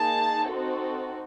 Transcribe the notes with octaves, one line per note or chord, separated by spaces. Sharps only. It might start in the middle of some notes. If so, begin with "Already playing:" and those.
Already playing: A#3 D#4 G#4 A5
C4 D#4 F#4 A4